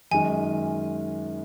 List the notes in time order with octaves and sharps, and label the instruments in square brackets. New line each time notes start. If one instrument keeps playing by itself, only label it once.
[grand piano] F#2 D#3 G#3 [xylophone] G#5